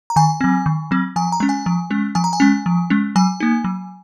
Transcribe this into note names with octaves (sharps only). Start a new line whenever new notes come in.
A#5
D#3 G#5
F#3 C4
D#3
F#3 C4
F3 G#5
A#5
G#3 C#4
G#5
F3
G#3 C#4
F3 G#5
A#5
G#5
G#3 C#4
F3
G#3 C#4
F#3 G#5
A#3 D#4
F#3